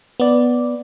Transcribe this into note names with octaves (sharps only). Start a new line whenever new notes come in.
B3 D5